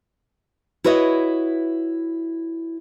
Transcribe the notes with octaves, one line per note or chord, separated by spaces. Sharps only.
E4 F#4 B4 C#5 D#5